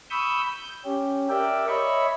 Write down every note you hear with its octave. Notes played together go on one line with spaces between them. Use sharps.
B5 C#6 D#6 E6 G6
G6
C#4 G4
G4 A#4 D5 E5 G5
C#5 D#5 E5 B5 C#6